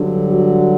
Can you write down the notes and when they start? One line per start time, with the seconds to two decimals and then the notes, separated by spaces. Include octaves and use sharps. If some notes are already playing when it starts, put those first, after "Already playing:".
Already playing: G2 D3 F#3
0.27 F#4